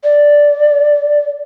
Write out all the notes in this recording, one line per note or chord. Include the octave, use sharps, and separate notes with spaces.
D5